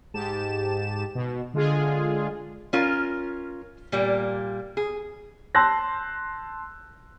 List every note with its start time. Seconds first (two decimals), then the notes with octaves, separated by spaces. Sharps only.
0.14 G#2 G4 A5 E7
1.15 B2
1.54 D3 G#3 F4 G#4
2.73 C#4 F4 A#4
3.92 A#2 G3 A#3
4.77 G#4
5.55 A5 C6 E6 F#6 G6 A#6